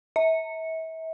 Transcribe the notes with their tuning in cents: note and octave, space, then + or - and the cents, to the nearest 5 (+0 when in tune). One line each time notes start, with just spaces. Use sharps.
E5 -35